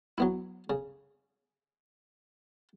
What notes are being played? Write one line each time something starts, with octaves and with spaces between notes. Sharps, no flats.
F#3 B3 E4
C#3